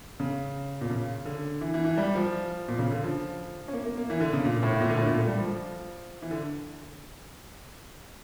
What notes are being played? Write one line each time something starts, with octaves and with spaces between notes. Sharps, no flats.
C#3
A#2
C#3
D3
E3
E3
E3
G3
F3
A#2
C#3
D3
F3
C#4
A#3
A#3
A#3
E3
D3
C#3
A#2
A2
A#2
D3
A2
A#2
A3
G3
F3
E3
D3